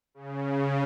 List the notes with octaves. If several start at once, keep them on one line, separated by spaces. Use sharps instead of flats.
C#3